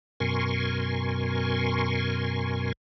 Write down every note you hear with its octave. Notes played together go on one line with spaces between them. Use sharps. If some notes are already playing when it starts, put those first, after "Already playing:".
F#2 B2 A#4 G#5 C6 C#6